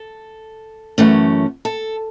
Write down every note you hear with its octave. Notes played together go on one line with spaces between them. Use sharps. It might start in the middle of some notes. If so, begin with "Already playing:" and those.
Already playing: A4
F#2 E3 A3 C#4
A4